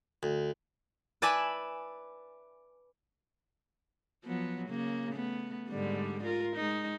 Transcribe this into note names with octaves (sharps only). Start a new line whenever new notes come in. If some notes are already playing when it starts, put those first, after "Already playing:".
D2
B4 D5 E5 G#5 A5 B5
F3 F#3 B3
C#3 A#3
A3 B3
G#2 D3 G3
F4 A#4
G#3 D#4